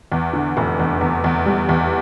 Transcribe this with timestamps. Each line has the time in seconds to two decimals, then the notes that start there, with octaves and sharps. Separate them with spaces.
0.12 E2
0.33 D3
0.57 F1
0.79 E2
1.01 E2
1.24 E2
1.46 G3
1.69 E2